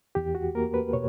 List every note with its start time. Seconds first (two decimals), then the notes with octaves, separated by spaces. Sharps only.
0.15 E2 G4
0.35 F#4
0.55 A#3 A#4
0.74 B4
0.93 B2 C#5